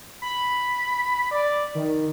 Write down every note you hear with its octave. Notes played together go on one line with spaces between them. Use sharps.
B5
D5
D#3